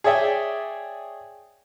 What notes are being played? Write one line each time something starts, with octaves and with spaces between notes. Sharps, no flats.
G#4 C#5 D5 E5 G5 G#5